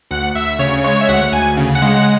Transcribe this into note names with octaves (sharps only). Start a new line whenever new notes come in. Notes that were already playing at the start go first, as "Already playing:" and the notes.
D2 F#5
D2 E5
C#3 C#5
G#3 C#5
E5
D2 F#5
D2 G#5
C#3
F#5
G#3
F#5